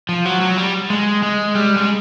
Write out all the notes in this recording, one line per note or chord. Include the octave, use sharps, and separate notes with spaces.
F3
F#3
F#3
G3
G#3
G#3
G3
G#3